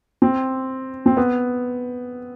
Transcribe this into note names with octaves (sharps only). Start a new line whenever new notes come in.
C4
C4
B3